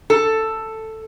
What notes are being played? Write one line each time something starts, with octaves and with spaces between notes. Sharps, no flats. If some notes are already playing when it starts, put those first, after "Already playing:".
A4